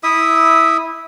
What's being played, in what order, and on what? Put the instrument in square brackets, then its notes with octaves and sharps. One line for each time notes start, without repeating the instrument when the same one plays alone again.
[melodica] E4 E5 D#6